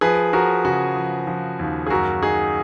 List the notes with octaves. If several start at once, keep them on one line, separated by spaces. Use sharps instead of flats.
F3 G#4 B4
F3 F#4 A#4
C#3 F#4
F3
F3
D#2
G#4
F#2 F#4 A#4
D#4 G#4